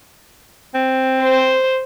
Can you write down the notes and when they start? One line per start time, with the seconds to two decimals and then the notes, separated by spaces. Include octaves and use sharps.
0.74 C4
1.23 C5